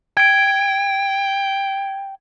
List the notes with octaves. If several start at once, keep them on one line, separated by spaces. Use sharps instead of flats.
G5 G#6 D7